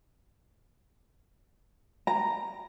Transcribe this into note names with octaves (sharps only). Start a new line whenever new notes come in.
A#5